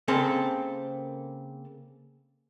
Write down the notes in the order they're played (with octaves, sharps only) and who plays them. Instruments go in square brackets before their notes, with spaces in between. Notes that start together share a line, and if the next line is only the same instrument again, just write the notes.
[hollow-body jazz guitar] C#3 A#3 C4 A4 C6